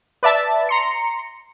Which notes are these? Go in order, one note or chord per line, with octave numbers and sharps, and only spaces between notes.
B4 D5 E5 A5
A#5 C6 C#7